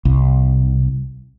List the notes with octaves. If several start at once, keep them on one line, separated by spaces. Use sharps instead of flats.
C2